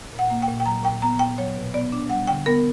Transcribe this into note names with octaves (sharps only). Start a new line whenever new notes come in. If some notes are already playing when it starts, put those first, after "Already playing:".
A#2
F#5
A#3
G5
A#2
G5
F#3 A#5
A#2 G5
B3 A#5
A#2 G5
F#3 C#5
B2
B3 D5
D4
G3 F#5
D3 G5
B3 A#4